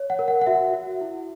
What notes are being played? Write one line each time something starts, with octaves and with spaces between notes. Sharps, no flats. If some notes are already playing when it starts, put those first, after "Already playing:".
Already playing: C#5
F#5
A#4
F#5
F#5
F#4 E5
F#4
E4